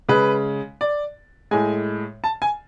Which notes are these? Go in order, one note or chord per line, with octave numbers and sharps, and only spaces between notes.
C#3 G#3 B4
D5
A2 G#3 G#5
A5
G#5